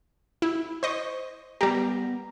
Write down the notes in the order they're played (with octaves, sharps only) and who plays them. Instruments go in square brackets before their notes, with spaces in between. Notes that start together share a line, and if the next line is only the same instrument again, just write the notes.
[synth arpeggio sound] E4
C5 D#5 C#6
[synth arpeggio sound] G3 G4 [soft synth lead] B3 [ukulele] A#4